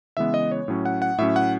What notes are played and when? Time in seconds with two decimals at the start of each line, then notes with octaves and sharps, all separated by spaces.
0.17 C#3 E3 G#3 B3 E5
0.34 D#5
0.51 C#5
0.68 A2 F#3 C#4
0.86 F#5
1.02 F#5
1.18 A2 F#3 C#4 E5
1.36 F#5